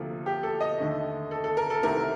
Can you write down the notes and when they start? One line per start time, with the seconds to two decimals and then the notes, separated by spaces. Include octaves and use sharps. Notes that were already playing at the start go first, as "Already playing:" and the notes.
Already playing: D2 C3 F3 A#3 A4
0.26 G4
0.43 A4
0.60 D#5
0.79 D#2 D3 A3
1.31 A4
1.44 A4
1.57 A#4
1.70 A4
1.83 C2 C3 D#3 A3 A#4